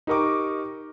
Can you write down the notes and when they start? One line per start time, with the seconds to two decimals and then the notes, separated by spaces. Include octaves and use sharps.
0.07 D#4 G4 A#4 C#6 D6